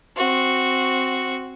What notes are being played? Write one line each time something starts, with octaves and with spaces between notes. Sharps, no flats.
C4 F#4